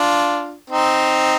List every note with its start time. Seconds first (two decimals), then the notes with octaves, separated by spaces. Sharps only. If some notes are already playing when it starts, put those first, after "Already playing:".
Already playing: D4 F4
0.70 C4 D#4